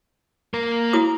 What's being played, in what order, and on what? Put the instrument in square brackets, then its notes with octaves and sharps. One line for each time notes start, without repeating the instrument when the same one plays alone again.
[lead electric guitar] A#3 A#4
[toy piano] E4 F#4 D#6